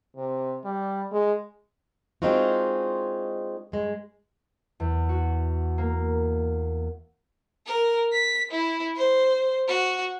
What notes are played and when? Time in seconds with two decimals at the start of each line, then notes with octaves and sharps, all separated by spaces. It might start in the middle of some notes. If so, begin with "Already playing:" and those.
0.17 C3
0.64 G3
1.12 G#3
2.22 G#3 C4 D4 D#4 F4 F#4
3.72 G2 G#3
4.80 E2
5.09 F#4
5.78 A#3
7.66 A#4
8.12 B6
8.51 E4
8.96 C5
9.68 F#4